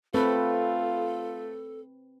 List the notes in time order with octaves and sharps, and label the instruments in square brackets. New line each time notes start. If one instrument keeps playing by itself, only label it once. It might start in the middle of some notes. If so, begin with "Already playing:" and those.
[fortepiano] A3 [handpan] C4 B4 [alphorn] F4 [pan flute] A4